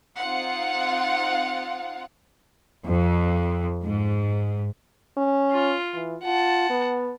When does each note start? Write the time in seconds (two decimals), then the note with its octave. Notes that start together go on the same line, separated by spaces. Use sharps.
0.19 C4 D#4 F4 F5 F#5
2.86 F2
3.83 G#2
5.17 C#4
5.52 F4
5.94 E3
6.24 F4 F#5 A5
6.70 B3